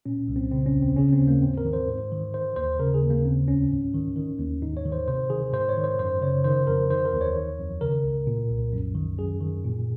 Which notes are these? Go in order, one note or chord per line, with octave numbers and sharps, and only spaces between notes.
A#2 C#4
C2
C4
C#3 C4
C#4
D#2
C4
C#3 C#4
C4
D#2
A#3
G#2 C4
A#4
D#3
C5
G#2
D#3
D#3 C5
D#2 C5
C#3 A#4
G#4
D#2
A#3
C#3 C4
C#2 C#4
G#2
D#3
D#3
D#2
G#2 D#4
C#5
D#3
C5
C3 C5
D#3 G#4
G#2 C5
C#5
D#3
C5
F#2 C5
C#3 C#5
D#3 C5
F2 A#4
D#3 C5
A#4
D#2
C#5
D#3
F2
C#3 A#4
C#2
A#2
C2
F#2
D#3
F#2 G#4
D#3
A#2